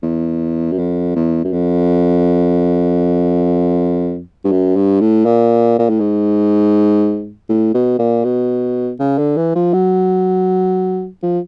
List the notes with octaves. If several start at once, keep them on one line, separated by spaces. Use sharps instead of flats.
E2
F#2
F2
E2
F#2
F2
G2
F#2
G2
A2
A#2
A#2
A2
G#2
A2
B2
A#2
B2
C#3
D3
E3
F3
F#3
F3